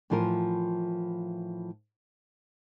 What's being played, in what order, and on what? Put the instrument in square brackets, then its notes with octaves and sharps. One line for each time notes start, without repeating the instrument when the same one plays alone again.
[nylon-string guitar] A2 E3 F3 F4 A#4